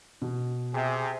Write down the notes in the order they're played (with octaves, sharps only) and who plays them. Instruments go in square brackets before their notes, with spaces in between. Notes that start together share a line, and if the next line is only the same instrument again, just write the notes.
[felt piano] B2
[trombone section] C3 G#4